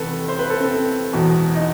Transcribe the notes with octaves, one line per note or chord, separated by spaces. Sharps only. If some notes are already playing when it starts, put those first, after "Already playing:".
Already playing: E2 C3 D#3 A4 B4
C5
B4
A4
C4
E1 E2 B2
D#4